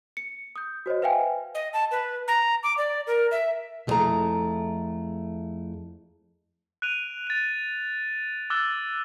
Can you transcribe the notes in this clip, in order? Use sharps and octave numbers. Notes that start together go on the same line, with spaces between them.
C#7
D#6 G6
F#4 C5 C#5 D#5
B4 E5 F5 G5 G#5
D#5
A5
B4
A#5
D6
D5
A#4
E5
F2 F#3 A3 E4 G#4 A#5
F#6 D7 D#7 F7
A6 F7
D6 E6 F#6 A6 G7